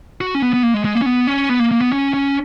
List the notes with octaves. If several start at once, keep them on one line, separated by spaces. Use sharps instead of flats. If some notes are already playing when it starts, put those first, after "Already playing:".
F#4
C#4
B3
B3
A#3
G#3
G#3
A#3
C#4
B3
C#4
B3
A#3
A#3
B3
C#4
C#4